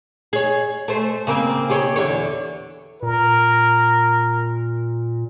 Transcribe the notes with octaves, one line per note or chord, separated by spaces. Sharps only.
G#4 C#5
A3 C5
C#3 A#3 C4
G4 G#4 C#5
E2 D3 C#5
A#2 A#4